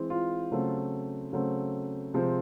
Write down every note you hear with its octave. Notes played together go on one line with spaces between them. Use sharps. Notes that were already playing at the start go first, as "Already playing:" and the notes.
Already playing: E3 G#3 C4
F4
C#3 F#3 A3 C4
C#3 F#3 A3 C4
C3 F3 G#3 C4